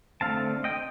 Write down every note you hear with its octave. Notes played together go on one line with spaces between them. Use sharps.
D3 A3 C4 F5 A5
D#5 G5